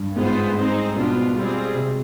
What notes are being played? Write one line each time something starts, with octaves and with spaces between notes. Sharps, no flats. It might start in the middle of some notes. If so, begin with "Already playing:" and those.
Already playing: G2
G#2 B3 F4 G#4 C5
C4 D#4 G#4 C5
B2 B3 D4 F4
G3 C4 F4 G#4
C3